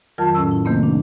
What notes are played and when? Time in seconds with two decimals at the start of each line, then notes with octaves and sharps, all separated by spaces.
0.18 F2 D#3 F#3 F4 A#4 A5
0.35 A2 C#4 E6
0.51 E4
0.65 C3 D#3 A3 A#3 C4
0.83 D4